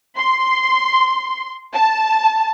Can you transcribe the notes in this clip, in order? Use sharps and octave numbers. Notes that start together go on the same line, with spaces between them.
C6
A5